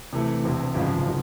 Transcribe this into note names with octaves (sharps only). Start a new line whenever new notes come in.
C3 E3 A3
E1 D2 C3
G#1 F#2 C#3 F3 G#3
C3 D#3 F#3